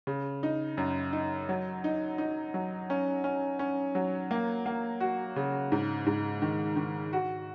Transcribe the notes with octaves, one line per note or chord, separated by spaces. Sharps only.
C#3
D#4
F#2
D#4
F#3
D#4
D#4
F#3
C#4
C#4
C#4
F#3
A#3
A#3
F#4
C#3
G#2
G#2
D#3
D#3
F#4